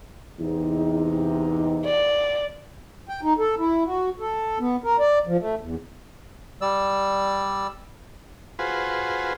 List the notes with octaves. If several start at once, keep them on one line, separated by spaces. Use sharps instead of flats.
E2 C3 D#4
D5
G5
D#4
A4
E4
F#4
A4
B3
A#4
D5
F3
A3
E2
G3 D5 E6
F4 F#4 G#4 B4 C5